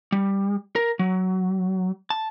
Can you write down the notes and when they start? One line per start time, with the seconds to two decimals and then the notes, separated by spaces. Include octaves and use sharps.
0.12 G3
0.76 A#4
0.99 F#3
2.10 A5